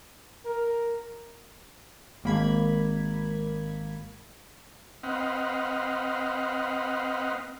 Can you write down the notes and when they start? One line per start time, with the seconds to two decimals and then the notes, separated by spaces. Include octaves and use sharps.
0.45 A#4
2.24 G#1 A#3 B5 G#6
5.03 C4 B4 D#5 F5 F#5